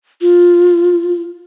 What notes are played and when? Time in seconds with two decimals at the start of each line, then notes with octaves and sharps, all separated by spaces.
0.21 F4